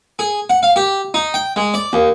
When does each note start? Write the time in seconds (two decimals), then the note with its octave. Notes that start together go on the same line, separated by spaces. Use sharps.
0.19 G#4
0.50 F#5
0.63 F5
0.76 G4
1.14 D#4
1.34 G5
1.56 G#3
1.74 D5
1.93 D#2